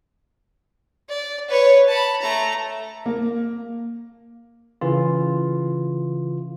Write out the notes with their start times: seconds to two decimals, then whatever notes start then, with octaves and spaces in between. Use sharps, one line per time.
1.09 D5
1.49 B4 C#5
1.88 A5 B5
2.21 A3 A#5
3.06 A#3
4.81 C#3 E3 F4